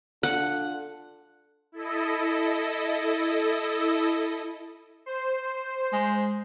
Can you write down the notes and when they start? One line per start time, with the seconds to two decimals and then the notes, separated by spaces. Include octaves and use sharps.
0.23 D4 F4 A4 F#5
1.72 E4 A4 D#5
5.06 C5
5.92 G#3